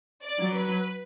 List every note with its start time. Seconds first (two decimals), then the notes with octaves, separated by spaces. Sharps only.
0.23 D5
0.39 F#3
0.55 B4